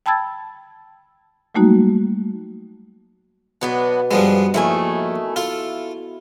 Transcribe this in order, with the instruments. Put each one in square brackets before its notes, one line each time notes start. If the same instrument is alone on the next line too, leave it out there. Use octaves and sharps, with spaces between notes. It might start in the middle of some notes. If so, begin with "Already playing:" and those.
[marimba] G5 A5 B5 E6 G#6 A6
F#3 G3 A3 A#3 D#4 F#4
[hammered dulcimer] B2 [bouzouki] F#3 B3 D4
[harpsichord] G2 F3 G#3 [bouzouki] B3
[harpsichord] A#1 [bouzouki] D#3 A3 G#5 [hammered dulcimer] E4 C#6
[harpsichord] F4 [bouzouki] A4